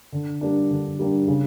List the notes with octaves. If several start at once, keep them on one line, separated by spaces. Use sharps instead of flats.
D3
G3 A#3 D4
D3
G3 A#3 D4
C#3